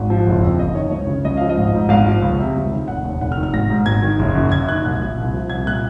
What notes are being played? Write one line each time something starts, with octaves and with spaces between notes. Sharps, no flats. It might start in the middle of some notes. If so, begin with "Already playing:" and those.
Already playing: G#1
F3
F#1
F2
F#1 D#5
D#3 C#5
C#2 C#5
C#3
C#2 D#5
F3 F5
D#5
G#1
G#2
G#1 F5
F3
C#2
C3
C#2
D#3
F1 F#5
D#2
F1 F#5
F6
D#3
F6
G#1 A#6
G#2
G#1 G#6
D#3
F#1
F#2
F#1 G#6
D#3 F#6
C2 F#6
A#2
C2
F3
C2 G#6
A#2 F#6